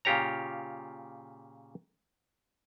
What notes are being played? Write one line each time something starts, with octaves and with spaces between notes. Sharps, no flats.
A#2 C#3 F4 G4 C#5 A#5